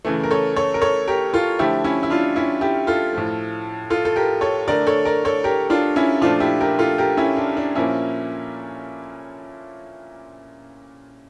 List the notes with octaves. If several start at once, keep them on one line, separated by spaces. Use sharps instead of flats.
C#3 E3 A3
A#4
A4 C#5
A4 C#5
A#4
A4 C#5
G4 A#4
F4 A4
D3 F3 A3 E4 G4
C#4 E4
E4
D4 F4
C#4 E4
E4 G4
F4 A4
A2 F3 A3
F4 A4
A4
G4 A#4
A4 C#5
D3 A3 A#4 D5
A4 C#5
A#4 D5
A4 C#5
G4 A#4
D4 F4
C#4 E4
A#2 F3 A3 D4 F4
E4 G4
G4 A#4
F4 A4
G4 A#4
C#4 E4
D4
D4
A#2 F3 A#3 C#4 E4